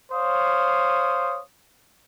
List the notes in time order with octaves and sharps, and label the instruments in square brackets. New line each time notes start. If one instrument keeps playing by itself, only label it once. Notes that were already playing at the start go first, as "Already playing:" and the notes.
[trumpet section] C5 C#5 F5 D#6